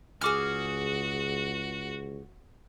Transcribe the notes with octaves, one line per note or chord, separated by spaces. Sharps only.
C#2 F#4 G#4 D6 F6